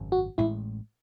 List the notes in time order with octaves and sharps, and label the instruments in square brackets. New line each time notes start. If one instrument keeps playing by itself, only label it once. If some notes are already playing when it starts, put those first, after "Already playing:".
Already playing: [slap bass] G#1 F#2 C#3
[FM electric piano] F#4
[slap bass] A1 A2 G#3 [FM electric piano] E4